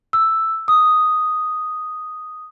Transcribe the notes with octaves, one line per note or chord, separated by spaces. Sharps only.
E6
D#6